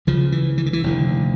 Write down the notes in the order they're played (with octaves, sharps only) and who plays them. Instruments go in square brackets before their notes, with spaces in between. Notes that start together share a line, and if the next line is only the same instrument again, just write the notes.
[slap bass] C#2 C#3 F3
E3
E3
D#3
E3
F1 D#2 D3